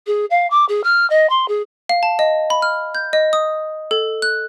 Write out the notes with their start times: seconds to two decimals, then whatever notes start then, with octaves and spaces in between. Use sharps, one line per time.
0.07 G#4
0.31 F5
0.50 D6
0.69 G#4
0.84 F6
1.10 D#5
1.30 C6
1.48 G#4
1.89 F5
2.03 A5
2.19 D#5
2.50 B5
2.62 F6
2.95 G6
3.13 D#5
3.33 D#6
3.91 A4
4.22 F#6